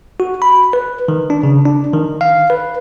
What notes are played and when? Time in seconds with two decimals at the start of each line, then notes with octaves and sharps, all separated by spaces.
0.20 F#4
0.42 B5
0.73 B4
1.08 D#3
1.30 D4
1.43 C#3
1.65 D4
1.93 D#3
2.21 F5
2.50 B4